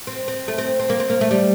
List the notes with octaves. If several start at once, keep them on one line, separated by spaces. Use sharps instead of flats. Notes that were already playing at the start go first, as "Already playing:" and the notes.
C4
C4
A3
C4
C4
A#3
C4
A#3
A3
G3